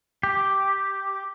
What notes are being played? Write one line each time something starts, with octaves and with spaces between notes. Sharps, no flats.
G4